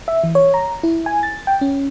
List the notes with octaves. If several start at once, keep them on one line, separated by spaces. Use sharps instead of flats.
E5
E3
C#5
A#5
E4
G#5
A6
G5
C#4